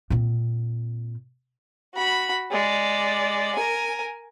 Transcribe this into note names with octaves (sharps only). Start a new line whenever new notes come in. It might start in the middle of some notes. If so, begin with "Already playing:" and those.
A#2 C4
F#4 B5
G#3 D5
A#4 G#5